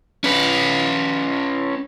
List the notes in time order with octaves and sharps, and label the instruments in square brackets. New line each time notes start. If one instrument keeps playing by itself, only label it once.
[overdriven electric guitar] C#4 B4